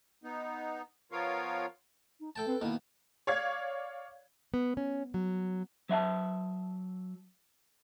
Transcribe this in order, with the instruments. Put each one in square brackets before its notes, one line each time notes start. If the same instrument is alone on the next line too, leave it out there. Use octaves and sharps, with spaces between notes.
[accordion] B3 D#4
F3 B3 F4 A#4 C#5 F5
[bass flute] D#4
[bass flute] A3 [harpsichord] A4 G5 A5
[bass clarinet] C4 [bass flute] B4
[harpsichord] B2 D#3 [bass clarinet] A#3 [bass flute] E4
[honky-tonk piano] C#5 D5 F5 G#6
[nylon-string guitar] B3
C#4
F#3
[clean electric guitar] F#3 E5 F5 A5